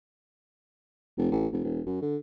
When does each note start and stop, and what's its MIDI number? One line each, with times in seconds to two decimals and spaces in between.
1.17 1.30 29
1.31 1.47 33
1.52 1.64 29
1.64 1.81 28
1.86 2.00 42
2.02 2.16 50